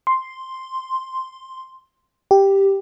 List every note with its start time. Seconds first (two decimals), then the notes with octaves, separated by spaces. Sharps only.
0.07 C6
2.31 G4